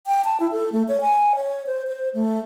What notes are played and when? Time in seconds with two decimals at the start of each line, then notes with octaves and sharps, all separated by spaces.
0.07 G5
0.25 A5
0.40 E4
0.52 A4
0.72 A3
0.88 C#5
1.01 G#5
1.35 C#5
1.66 C5
1.87 C5
2.14 A3